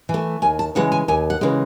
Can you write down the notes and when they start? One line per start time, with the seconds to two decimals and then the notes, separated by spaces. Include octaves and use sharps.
0.09 E3
0.14 A3
0.42 D#2 G#5
0.59 A5
0.75 C#3 E3 G#3 F#5
0.92 G#5
1.08 D#2 G#5
1.30 F#5
1.41 C#3 E3 G#3